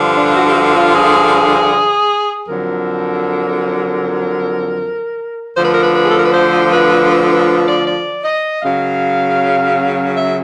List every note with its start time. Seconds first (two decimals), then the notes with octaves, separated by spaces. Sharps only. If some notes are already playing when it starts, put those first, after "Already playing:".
Already playing: G2 D3 F3
0.17 D4
0.36 F#4
0.48 G4
0.55 F#4
0.74 F4
0.93 G#4
2.47 F2 D3 F#3 A#4
5.55 D2 D3 F3 C5
5.63 B4
5.72 A#4
5.81 B4
5.93 B4
6.04 G#4
6.11 A4
6.17 A#4
6.24 B4
6.32 C5
6.66 C5
6.71 B4
7.09 B4
7.28 B4
7.47 B4
7.66 D5
7.86 D5
8.23 D#5
8.62 F#2 C#3 F#3 F5
10.16 E5